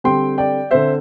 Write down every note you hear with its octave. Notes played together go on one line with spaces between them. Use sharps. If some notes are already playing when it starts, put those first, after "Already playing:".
D3 G3 C4 G5 C6
D5 G5
D3 C4 C5 E5